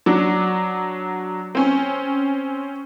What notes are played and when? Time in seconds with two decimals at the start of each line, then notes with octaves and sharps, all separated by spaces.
0.06 F#3 D4
1.55 C4 C#4